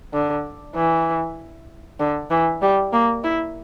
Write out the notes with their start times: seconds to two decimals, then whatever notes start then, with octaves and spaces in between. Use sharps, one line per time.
0.13 D3
0.76 E3
2.00 D3
2.30 E3
2.62 G3
2.93 A#3
3.24 E4